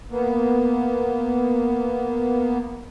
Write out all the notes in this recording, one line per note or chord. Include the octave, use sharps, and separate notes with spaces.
A#3 B3